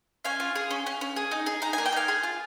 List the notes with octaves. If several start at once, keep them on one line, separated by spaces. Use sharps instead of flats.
C#4 F5 G#5
F4
G#4
C#4
C#4
C#4
G#4
D#4
G#4
D#4 A#5
A#3 G#5
G5
D#4 F5 G#5
G#4
F4